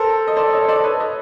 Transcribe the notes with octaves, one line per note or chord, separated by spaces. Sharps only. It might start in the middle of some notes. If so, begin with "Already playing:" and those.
Already playing: A4 A#4 C5
D#5
C5 D5
C#5 D#5
C5 D5
B4 C#5
C#5 D#5